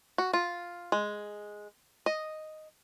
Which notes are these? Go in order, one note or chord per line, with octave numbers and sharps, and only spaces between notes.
F#4
F4
G#3
D#5